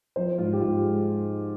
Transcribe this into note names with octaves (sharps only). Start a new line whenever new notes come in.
F3 C5
G#2 F4
G4
G#2 F4
G#3